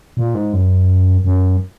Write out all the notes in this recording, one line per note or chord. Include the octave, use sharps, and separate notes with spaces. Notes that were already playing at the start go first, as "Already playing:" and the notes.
A#2
G#2
F#2
F#2